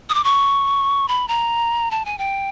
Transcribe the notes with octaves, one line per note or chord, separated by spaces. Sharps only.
D#6
D6
C#6
B5
A#5
A5
G#5
G5